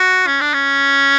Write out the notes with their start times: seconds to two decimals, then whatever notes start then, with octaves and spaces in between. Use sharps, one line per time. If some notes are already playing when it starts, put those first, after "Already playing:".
Already playing: F#4
0.27 C#4
0.41 D4
0.54 C#4